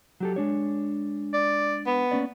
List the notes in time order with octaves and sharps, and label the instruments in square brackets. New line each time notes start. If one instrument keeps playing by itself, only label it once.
[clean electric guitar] F#3 G4 A4
G#3 D4 C#5
[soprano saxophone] D5
B3
[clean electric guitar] A#3 C#4 D5